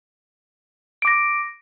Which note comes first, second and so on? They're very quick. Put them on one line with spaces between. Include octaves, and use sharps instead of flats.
D7 D6 A#6